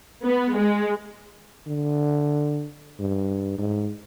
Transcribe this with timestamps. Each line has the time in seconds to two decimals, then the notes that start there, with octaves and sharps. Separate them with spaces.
0.24 B3
0.55 G#3
1.67 D3
3.00 G2
3.58 G#2